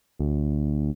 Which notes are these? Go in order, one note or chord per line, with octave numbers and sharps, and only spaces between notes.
D2